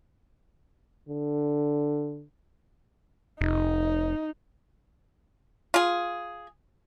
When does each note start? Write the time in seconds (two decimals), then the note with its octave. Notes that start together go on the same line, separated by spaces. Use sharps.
1.09 D3
3.41 F1 D#4
5.74 F4 G#4